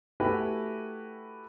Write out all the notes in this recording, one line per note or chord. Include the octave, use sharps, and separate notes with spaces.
A3 E4 F#4 G4 B4 G#5